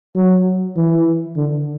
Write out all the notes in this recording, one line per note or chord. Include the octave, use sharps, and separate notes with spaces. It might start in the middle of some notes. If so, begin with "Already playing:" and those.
F#3
E3
D3